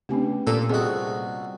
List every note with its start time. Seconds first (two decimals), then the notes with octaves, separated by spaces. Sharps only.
0.09 C#3 A3 B3 C4 D4 G4
0.47 A#2 A4
0.70 C2 C4 F4 F#4 G#4 D#5